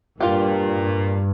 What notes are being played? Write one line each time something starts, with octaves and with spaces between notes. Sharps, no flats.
G2 A#2 F4 G4